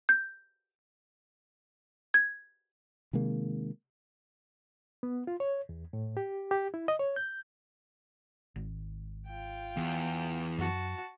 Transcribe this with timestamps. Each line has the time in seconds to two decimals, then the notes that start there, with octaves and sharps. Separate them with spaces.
0.09 G6
2.14 G#6
3.13 C3 D#3 G#3 A#3
5.03 B3
5.27 F4
5.40 C#5
5.69 E2
5.93 A2
6.17 G4
6.51 G4
6.74 E4
6.88 D#5
6.99 C#5
7.16 G6
8.56 G#1
9.27 F4 G5
9.77 E2
10.58 F#2 F#4 A5